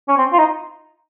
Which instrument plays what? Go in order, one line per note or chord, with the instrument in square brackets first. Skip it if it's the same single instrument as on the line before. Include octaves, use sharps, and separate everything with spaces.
[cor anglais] C#4
C4
F4
D#4